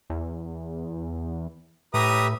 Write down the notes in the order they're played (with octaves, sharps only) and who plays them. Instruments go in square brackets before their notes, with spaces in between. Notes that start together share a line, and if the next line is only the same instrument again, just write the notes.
[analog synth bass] E2
[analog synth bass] A2 [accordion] G4 B4 E5 [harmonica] A#5 D#6